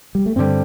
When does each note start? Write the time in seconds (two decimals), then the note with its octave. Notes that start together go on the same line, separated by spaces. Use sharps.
0.15 G3
0.26 A3
0.36 G2 D3 G3 C4